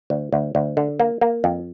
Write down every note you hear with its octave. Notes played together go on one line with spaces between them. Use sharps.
D2
D2
D2
D3
A#3
A#3
F2